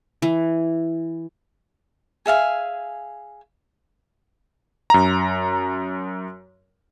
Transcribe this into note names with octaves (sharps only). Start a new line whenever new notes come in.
E3
G#4 E5 F5 G#5
F#2 A#5